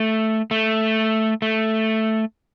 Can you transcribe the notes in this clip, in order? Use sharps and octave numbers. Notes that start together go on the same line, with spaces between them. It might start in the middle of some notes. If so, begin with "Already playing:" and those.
Already playing: A3
A3
A3